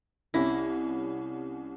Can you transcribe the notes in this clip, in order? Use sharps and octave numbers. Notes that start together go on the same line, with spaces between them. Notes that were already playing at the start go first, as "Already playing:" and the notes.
C2 C#4 E4 A#6